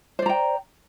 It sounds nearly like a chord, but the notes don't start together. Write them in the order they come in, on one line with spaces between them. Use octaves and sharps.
C5 D5 A#5 G5